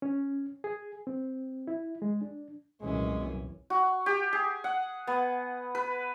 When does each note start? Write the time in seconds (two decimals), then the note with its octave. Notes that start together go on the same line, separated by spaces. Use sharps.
0.02 C#4
0.64 G#4
1.07 C4
1.67 E4
2.02 G#3
2.21 D4
2.81 C2 F#2 A#2 E3 G#3 C#4
3.70 F#4
4.06 G4
4.33 G#4
4.64 F#5
5.07 B3
5.75 B4